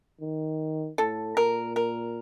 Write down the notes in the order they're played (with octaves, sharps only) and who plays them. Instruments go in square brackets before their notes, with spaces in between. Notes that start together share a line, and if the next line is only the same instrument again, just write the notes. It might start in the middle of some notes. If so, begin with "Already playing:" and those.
[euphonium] D#3
[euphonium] A2 [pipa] A4
[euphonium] A#2 [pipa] A#4
[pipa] A#4